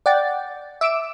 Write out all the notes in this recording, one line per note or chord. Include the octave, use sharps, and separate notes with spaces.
D5 F#5 G5 A6
E5 D6 E6 D7 E7